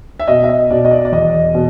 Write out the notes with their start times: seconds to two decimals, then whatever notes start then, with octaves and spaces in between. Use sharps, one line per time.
0.20 E5
0.28 B2 D#5
0.43 E5
0.49 D#5
0.71 B2 D5
0.85 D#5
0.91 D5
1.05 D5
1.12 E2 D#5
1.55 B2